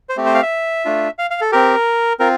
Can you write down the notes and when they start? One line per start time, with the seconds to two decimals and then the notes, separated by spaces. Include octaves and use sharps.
0.09 C5
0.17 A3 C4 G4
0.26 C5
0.34 F5
0.42 E5
0.85 A3 D4 F4
1.19 F5
1.30 F5
1.41 A4
1.52 C4 G4 A#4
2.20 C4 F4 A#4